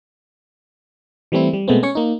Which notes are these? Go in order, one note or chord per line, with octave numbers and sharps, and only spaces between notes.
E3 G3 A3 C4 E4
G3
B2 G#3 A3 B3 C4
C#4 C#5 C#6
A#3 D#4